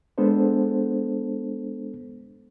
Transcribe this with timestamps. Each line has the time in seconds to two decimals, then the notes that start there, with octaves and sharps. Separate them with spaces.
0.18 G#3 B3 D4 A4 C5